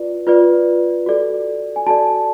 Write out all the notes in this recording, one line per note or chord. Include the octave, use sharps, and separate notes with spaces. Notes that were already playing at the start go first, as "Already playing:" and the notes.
Already playing: F4 B4 D5
F4 B4 D5
F#4 A4 D5
G#5
F#4 A4 D5 A5